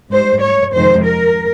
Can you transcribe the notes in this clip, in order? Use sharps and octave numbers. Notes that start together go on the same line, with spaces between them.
G#2 G3 C5
C#5
F2 C3 D#3 G#3 C5
A#4